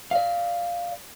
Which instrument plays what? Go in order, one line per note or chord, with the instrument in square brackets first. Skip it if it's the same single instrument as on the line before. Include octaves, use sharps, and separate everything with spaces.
[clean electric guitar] D5 F5